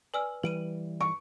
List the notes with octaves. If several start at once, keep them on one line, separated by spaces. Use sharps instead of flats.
B4 D5 G#5 E6 F6
E3 G3 B4 D7 D#7
C#6 D7